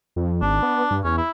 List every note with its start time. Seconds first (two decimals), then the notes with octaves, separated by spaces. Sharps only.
0.16 F2
0.42 G#1 D4
0.63 B3
0.91 G2
1.04 E2 C#4
1.18 E4